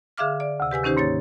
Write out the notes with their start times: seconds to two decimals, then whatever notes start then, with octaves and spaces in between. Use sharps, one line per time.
0.18 D3 G#4 E5 F5 D6 F6
0.40 D5
0.60 D2 C3
0.71 G4 B4 G#5 E6
0.83 D#3 C#4 D#4 G4 C5
0.97 G#2 A#3 C#5 A6